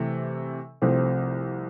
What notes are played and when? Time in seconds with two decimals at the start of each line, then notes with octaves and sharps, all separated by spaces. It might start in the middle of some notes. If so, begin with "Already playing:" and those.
Already playing: C3 E3 A3
0.82 C2 C3 F3 A3 C4